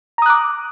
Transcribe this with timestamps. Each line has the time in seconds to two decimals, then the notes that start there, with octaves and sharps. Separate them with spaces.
0.18 A#5
0.22 D#6
0.26 F#6
0.30 D6